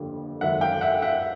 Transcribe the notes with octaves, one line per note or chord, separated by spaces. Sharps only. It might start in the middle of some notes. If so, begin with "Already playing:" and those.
Already playing: G1 F2 D3 G3 A#3
G#1 F#2 D3 E5 F#5
F5 G5
E5 F#5
E5 F#5